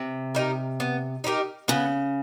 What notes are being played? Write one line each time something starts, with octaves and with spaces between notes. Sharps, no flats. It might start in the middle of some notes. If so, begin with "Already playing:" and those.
Already playing: C3
D#4 G4 A#4
B3
D#4 G4 A#4
C#3 B3